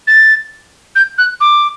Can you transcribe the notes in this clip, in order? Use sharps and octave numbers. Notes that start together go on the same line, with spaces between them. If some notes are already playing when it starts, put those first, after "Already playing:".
A6
G6
F#6
D6